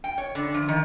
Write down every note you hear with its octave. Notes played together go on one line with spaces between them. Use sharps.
G5
C#5
D3
F3
D#3